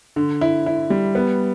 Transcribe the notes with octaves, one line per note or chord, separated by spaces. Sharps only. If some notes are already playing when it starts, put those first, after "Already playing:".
D3
E4
E4
G3
B3